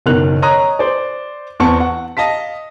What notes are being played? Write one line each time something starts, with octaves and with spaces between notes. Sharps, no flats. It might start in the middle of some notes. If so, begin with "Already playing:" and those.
F#1 B2 D#3 C#4 F#6 F7
C#5 D#5 A#5 D#6 F#6
C5 D5
E2 B3 C4 A5 C#6 C#7
F#5
D#5 F5 A5 B6